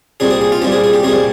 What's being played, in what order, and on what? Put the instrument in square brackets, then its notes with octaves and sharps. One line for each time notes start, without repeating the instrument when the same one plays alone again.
[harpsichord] C2 A#2 G3 G#4
G#4
G#4
F4
C2 A#2 G3 G4
G#4
G#4
G4
C2 A#2 G3 G#4